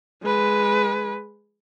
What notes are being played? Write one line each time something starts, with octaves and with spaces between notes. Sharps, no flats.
G#3 B4